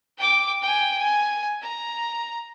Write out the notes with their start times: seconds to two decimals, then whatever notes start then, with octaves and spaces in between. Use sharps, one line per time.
0.18 G5 D6
0.62 G5 G#5
0.98 G#5
1.62 A#5